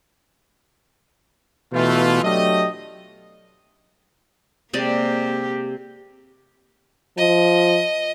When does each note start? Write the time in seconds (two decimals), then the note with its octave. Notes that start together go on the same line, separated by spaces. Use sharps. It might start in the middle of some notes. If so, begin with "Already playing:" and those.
1.73 B2 E3 A3 F4
2.23 F#3 A3 D4 G4 D#5
4.73 C3 G#3 A#3 G4 D5
7.18 F3 D#5